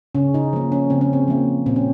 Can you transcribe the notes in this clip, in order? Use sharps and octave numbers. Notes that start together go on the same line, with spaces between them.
C#3 C#4
D#4
F3 A#3
C#4
C#3 C4
C#4
C4
F3 A#3
A#2 C4
C#4